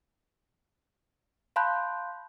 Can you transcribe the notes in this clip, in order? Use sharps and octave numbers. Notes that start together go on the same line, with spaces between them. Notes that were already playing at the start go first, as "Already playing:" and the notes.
F5 A5 B5 C6 F#6 G6